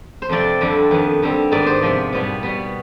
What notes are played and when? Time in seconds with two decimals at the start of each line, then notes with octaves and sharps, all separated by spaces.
0.22 C5
0.29 F2 C3 F3 C4 D5
0.61 F2 D3 G3 C4
0.91 F2 D#3 B3
1.22 D3 G3 C4
1.51 G#2 D#3 B3 D5
1.67 C5
1.82 C3 F3 B3
2.13 B2 G3 B3
2.43 B2 G3 B3